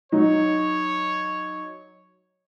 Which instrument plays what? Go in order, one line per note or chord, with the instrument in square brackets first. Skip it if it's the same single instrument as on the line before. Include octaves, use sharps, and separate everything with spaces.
[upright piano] F#3 D#4 [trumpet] C#5